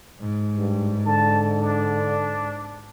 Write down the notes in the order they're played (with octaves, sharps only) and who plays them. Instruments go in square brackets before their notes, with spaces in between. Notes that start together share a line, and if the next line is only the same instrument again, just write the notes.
[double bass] G#2
[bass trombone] G2
[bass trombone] D3 [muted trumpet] A5
[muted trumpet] D4